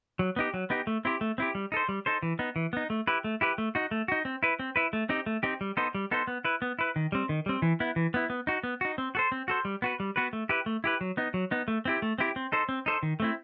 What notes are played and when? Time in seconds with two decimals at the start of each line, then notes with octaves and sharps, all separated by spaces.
0.19 F#3
0.36 B3 D#4 G4
0.54 F#3
0.70 B3 D#4 G4
0.87 A3
1.05 C4 E4 G4
1.21 A3
1.38 C4 E4 G4
1.55 G3
1.72 D#4 A4 C5
1.89 G3
2.06 D#4 A4 C5
2.23 E3
2.39 B3 D#4
2.56 E3
2.73 B3 D#4
2.90 A3
3.07 E4 G4 B4
3.24 A3
3.41 E4 G4 B4
3.58 A3
3.75 D#4 F#4
3.91 A3
4.08 D#4 F#4
4.25 C4
4.43 E4 B4
4.59 C4
4.76 E4 B4
4.93 A3
5.09 C4 D#4 G4
5.26 A3
5.43 C4 D#4 G4
5.61 G3
5.77 B3 D#4 A4 C5
5.95 G3
6.11 B3 D#4 A4 C5
6.27 B3
6.45 E4 B4
6.62 B3
6.79 E4 B4
6.96 D#3
7.12 G3 C4
7.29 D#3
7.46 G3 C4
7.62 E3
7.80 B3 E4
7.96 E3
8.14 B3 E4
8.30 B3
8.47 D#4 F#4
8.64 B3
8.81 D#4 F#4
8.98 C4
9.15 F#4 A4 C5
9.32 C4
9.48 F#4 A4 C5
9.65 G3
9.82 B3 F#4 B4
10.00 G3
10.16 B3 F#4 B4
10.33 A3
10.49 E4 G4 B4
10.66 A3
10.84 E4 G4 B4
11.01 F#3
11.17 B3 D#4
11.34 F#3
11.51 B3 D#4
11.68 A3
11.85 C4 E4 G4
12.02 A3
12.18 C4 E4 G4
12.36 C4
12.52 D#4 A4 C5
12.69 C4
12.86 D#4 A4 C5
13.03 D#3
13.20 A3 C4 E4